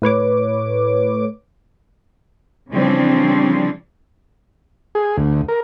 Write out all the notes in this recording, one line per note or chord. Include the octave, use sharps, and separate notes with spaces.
A2 B4 C#5 D6
C#3 E3 F3 G3 C4 D4
G#4
D2
A#4